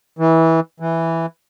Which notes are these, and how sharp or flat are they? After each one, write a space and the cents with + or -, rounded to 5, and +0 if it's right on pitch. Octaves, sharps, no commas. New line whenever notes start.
E3 -20
E3 +0